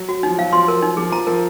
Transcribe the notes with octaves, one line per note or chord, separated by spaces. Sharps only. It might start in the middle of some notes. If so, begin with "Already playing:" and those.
Already playing: F#3
F#4
F3 D#4
F#3 F5
F3 C6
A#4
D#4
F3 G#4
F3 A#5
F3 A#4